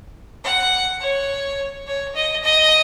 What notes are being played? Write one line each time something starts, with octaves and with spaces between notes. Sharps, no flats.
F#5
C#5
C#5
D#5
D#5